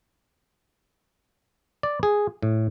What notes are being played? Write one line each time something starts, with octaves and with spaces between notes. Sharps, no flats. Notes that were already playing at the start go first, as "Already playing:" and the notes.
D5
G#4
A2